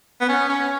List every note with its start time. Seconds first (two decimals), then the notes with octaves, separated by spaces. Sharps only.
0.20 B3
0.29 C#4
0.49 C#4